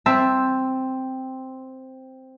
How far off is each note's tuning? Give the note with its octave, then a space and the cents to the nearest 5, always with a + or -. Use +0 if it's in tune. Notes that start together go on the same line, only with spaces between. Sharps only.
C4 +0 E5 +0 A5 +0